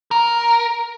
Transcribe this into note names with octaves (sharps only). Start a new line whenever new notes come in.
A#4